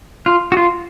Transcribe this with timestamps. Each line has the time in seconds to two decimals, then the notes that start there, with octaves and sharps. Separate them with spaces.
0.26 F4
0.52 F#4
0.57 F4